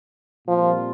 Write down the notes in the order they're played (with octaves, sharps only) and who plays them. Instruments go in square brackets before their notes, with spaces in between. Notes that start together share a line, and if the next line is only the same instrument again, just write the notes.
[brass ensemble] A#2 G3 C4 F4 A#4 [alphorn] F3